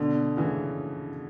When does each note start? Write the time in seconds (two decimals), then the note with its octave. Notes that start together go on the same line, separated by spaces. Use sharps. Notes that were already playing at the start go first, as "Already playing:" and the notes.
Already playing: B2 D3
0.37 C#3 E3